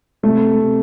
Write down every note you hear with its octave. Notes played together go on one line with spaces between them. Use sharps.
C3 A3
C3